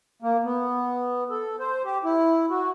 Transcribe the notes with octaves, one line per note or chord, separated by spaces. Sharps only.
A#3
B3
A4
C5
G4
E4
F#4